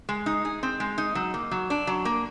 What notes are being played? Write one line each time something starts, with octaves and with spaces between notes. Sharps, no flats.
G#3
D#4
G#4
C4
G#3
D#4
F#3
A#3
F#3
D4
F#3
A#3